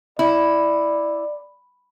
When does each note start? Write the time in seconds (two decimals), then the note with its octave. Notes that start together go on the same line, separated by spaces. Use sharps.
0.19 E4 D5